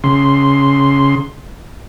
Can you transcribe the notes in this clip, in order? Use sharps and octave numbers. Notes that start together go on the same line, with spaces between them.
C#3 C6